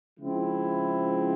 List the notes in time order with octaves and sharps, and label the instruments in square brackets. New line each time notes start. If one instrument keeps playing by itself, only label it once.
[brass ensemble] C#3 F3 G#3 C4 E4